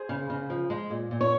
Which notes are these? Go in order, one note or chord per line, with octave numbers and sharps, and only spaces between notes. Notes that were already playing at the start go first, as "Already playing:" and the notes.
Already playing: G#4 C5
C#3
C#3
F3
G#3
A#2
A#2
C#5